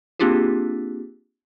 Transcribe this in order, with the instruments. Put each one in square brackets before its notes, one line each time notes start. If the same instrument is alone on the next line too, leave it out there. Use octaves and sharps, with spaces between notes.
[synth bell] A#3 C4 D4 F4 G4 G#4